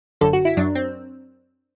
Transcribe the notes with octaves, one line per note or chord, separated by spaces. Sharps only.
G1 F#2 D3 A4
F#4
E4
F#2 F#3 D4
C4